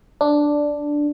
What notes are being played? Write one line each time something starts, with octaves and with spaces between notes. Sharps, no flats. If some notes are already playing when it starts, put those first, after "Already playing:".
D4